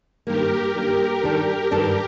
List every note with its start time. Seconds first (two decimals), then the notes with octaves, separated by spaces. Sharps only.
0.26 G2 D#3 G3 A#3 G4 A#4
0.74 G2 D#3 G3 A#3 G4 A#4
1.22 G2 D#3 G3 D4 G4 A4 A#4
1.70 G2 D#3 G3 D4 G4 A4 A#4